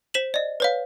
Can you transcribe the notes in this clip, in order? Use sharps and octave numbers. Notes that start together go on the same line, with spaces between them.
C5 B6 E7 F#7
D5 D#5
B4 C#5 F5